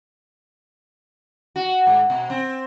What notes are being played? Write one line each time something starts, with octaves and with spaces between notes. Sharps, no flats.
F#4
G#2
B2
C4